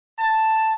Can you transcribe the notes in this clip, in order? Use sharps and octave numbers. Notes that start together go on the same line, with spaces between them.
A5